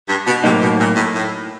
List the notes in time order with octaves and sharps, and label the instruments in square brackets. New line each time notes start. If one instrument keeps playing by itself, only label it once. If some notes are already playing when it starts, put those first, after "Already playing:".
[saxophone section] G2
B2
[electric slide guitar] A2 F#3 A#3 D#4 [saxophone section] C3
[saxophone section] B2
A#2
A2
A2